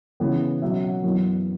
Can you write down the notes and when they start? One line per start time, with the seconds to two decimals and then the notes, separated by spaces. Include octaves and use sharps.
0.20 C#3 E3 B3
0.61 B2 F#3 C#4 E5
0.83 F#5
1.04 F#2 E3 B3